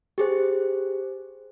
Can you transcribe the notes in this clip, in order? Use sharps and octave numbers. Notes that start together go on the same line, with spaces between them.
G4 G#4 C5